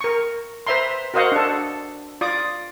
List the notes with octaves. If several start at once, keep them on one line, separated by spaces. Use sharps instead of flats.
A#4 C#6
B4 C5 E5 A#5 C6
F#4 A#4 C5 D#5 F5 F#5
D4 A4
F4 D5 D6 D#6